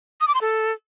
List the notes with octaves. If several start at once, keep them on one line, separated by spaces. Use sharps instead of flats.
D#6
D6
C6
A4